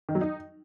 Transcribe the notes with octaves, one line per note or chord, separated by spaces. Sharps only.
D#3
F#3
D#4